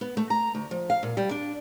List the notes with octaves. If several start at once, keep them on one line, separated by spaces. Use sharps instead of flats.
B3
A3
A#5
D2
F3
F5
A#2
G3
D4